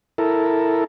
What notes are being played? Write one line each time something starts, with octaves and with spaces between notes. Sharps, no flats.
E4 A4 A#4